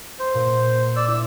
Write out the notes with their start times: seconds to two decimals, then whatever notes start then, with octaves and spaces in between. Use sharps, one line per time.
0.19 C5
0.34 A#2
0.96 D5 E6
1.08 E4 E6